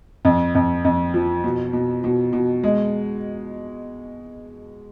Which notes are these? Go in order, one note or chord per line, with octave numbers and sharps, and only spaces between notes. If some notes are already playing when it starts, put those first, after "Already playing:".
F2
F2
F2
F3
B2
B2
B2
B2
G#3